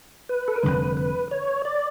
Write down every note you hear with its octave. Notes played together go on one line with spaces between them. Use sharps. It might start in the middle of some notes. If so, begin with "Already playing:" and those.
B4
A4
A#4
F1 F2 D3 G3 B4
B4
C#5
D5